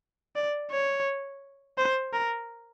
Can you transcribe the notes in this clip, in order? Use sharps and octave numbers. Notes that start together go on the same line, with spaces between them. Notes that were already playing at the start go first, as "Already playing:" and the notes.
D5
C#5
C5
A#4